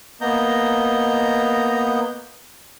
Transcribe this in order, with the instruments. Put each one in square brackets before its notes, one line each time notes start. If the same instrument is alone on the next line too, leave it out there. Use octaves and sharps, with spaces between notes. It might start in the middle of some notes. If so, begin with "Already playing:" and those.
[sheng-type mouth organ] A#3 B3 D#5 A#5 G6